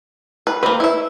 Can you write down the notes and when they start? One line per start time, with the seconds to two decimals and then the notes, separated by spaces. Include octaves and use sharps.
0.47 B4
0.63 A#3 C4 B4
0.80 E4 E5